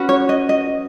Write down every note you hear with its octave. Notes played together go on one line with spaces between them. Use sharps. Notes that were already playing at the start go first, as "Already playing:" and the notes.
Already playing: C#4 F#4 B4
C#5
D#5
D#5